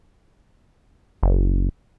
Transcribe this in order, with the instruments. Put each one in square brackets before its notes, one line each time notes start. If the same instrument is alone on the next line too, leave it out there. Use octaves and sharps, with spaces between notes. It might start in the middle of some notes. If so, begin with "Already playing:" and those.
[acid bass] F#1